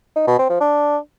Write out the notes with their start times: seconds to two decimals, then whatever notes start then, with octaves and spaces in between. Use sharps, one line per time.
0.16 D#4
0.27 B2
0.38 C4
0.50 F3
0.61 D4